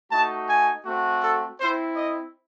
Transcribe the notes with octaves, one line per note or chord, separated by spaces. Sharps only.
A3 D#4 F#4 A5
G#5
A3 C4 F#4
A4
C4 E4 C5
D#5